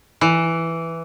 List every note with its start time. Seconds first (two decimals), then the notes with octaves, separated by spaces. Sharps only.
0.21 E3